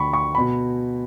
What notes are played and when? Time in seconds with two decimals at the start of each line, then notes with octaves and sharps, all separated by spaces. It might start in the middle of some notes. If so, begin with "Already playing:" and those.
Already playing: D2 D3 B5 C#6
0.13 C#6
0.35 B5
0.38 B2